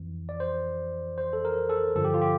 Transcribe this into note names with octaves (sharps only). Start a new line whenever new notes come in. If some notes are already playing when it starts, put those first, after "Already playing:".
Already playing: F2 E3
D5
C5
C5
A4
A#4
A4
G2 D3 F3 A4
G4
F4
G4